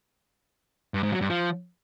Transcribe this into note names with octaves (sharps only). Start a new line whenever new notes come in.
G2
G#2
F#3
G2
F3